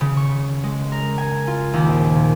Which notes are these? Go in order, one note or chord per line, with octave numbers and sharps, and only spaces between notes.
C#3
C#6
G#3
A#4
G#5
F4
D#2
A#1
A#2